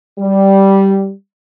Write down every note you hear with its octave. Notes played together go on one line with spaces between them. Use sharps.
G3